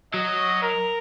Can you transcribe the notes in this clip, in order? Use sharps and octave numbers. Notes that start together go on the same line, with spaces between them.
F#3 D#5
A#4